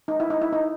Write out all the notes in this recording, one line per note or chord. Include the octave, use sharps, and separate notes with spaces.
D#4
E4
D#4
E4
D#4